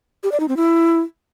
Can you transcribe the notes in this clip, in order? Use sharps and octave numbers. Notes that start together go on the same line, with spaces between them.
G4
D5
D#4
C4
E4